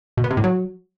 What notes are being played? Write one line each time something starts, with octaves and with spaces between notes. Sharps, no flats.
B2
B3
C3
A2
F#3